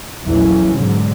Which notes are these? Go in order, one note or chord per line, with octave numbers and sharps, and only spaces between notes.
A#1 E2 E3 F#3 A3 C#4
G#2 B2 D3 F#3